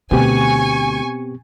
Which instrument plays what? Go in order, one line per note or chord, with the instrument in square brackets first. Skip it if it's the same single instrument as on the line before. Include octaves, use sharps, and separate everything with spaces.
[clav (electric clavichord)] D2 [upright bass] B2 [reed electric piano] B3 C4 G4 [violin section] G#5 C#6